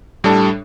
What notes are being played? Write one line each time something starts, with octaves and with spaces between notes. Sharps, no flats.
A2 G3 D4 A4